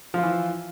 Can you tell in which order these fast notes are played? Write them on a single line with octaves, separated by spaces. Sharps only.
F3 F4 E3